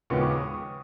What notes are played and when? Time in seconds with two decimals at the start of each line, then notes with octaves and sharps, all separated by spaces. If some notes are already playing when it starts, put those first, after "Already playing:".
0.10 D#2 C#3 F3 G#3 B3 C#6
0.21 D6
0.31 D#6
0.40 C#6